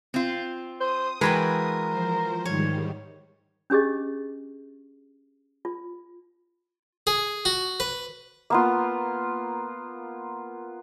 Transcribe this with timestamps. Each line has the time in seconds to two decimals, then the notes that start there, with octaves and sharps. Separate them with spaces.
0.14 C4 F4
0.80 C5 D#6
1.21 E3 G#3 F#4 A#4 B4 G5
1.88 F3 C5
2.45 G#2 D#3 G3 C#5
3.70 C#4 D4 G4 G#4 D#5
5.65 F4
7.07 G#4
7.45 F#4
7.80 B4
8.50 A#3 B3 F4